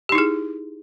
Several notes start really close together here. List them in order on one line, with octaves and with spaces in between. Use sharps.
G4 D#4 E4 G#4